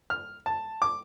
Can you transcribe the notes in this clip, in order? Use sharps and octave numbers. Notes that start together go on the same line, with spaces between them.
F6
A5
D6